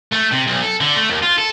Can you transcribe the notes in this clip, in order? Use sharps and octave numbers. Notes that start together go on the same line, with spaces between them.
A3
C3
B1
A4
D3
A3
D#2
F4
A4